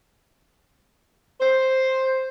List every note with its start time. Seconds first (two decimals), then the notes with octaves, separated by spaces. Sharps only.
1.41 C5